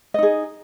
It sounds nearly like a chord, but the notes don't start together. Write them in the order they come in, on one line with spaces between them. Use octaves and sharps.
D#5 D#4 G#4